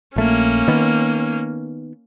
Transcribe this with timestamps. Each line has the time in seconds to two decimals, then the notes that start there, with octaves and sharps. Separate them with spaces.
0.16 A#1 A3 A#3 C#4
0.68 D#3 B3